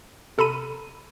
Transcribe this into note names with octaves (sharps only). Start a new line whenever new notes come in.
C3 A4 A#5 B5 D#7